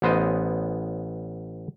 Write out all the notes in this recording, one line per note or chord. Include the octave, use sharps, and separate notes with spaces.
A1 B3 C5 D#5